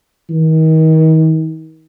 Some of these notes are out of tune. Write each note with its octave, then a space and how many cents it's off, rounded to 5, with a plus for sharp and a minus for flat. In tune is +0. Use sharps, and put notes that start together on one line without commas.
D#3 +35